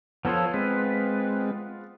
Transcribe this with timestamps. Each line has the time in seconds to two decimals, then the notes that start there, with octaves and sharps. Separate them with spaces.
0.25 F3 B3 F4 A4 C#5
0.54 G#3 C4 B4